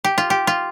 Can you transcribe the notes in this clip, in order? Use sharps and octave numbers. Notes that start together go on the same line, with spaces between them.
G4
F4
G4
F4